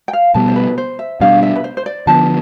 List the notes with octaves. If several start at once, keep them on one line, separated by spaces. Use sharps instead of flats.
G5
F5
B2 G3 B3 A5
C5
B4
C5
E5
B2 G3 D4 F5
E5
B4
C5
C5
D5
D3 F3 B3 A5